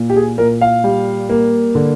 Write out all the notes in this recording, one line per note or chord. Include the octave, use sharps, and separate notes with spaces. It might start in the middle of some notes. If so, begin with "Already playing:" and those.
Already playing: A#2
G4
G#4
A#2 A#4
F5
G3
A#3
D3